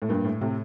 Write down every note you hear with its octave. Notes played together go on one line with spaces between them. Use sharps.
A2
G2 A#2
A2
A2 C3